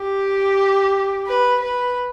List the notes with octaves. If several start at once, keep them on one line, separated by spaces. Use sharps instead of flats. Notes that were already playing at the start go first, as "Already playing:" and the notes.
Already playing: G4
B4
B4